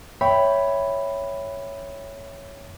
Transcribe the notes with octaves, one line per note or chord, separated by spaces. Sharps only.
C#5 E5 G5 B5